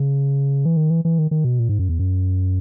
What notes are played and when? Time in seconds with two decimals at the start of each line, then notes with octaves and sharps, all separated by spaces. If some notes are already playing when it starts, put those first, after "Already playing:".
Already playing: C#3
0.65 E3
0.77 D#3
0.90 E3
1.05 E3
1.19 D#3
1.31 D#3
1.44 B2
1.59 A#2
1.69 G#2
1.79 F#2
1.89 E2
1.99 F#2